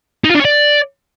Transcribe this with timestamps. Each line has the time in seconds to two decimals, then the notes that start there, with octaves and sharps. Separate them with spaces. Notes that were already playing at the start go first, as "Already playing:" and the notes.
0.24 D#4
0.29 F4
0.35 D4
0.40 C#5
0.45 D5